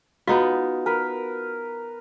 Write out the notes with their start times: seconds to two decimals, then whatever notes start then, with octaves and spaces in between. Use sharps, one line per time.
0.27 B3 D#4 F4 F#4
0.86 A#4 B4 B5